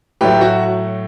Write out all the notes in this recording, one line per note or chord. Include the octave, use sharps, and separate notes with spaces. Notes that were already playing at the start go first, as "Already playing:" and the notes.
A2 F#3 A3 G4 B4
F#4